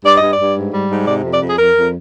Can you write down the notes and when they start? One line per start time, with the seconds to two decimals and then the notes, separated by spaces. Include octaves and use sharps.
0.05 G2 D5
0.17 G2 D#5
0.31 D5
0.39 G2
0.55 G#2
0.72 G3
0.90 G#2
1.06 C3 D5
1.24 F2
1.33 D5
1.40 F2
1.47 G#4
1.58 F2 A#4
1.75 F2